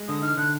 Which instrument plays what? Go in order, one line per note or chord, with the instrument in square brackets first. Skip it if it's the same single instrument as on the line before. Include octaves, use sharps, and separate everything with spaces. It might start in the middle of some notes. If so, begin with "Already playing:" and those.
Already playing: [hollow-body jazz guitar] G#3
[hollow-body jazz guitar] D3 [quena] D#6
[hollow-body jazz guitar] D#4 [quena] F6
[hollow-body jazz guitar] D3 [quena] F#6